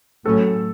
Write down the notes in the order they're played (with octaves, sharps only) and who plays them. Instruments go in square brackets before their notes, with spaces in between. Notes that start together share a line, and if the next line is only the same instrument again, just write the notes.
[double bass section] A2 F#3 C#4 [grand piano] A4